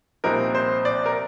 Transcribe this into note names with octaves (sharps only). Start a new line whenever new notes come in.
C2 A#2 F3 C4 D#4 A#4
C5
D5
A#4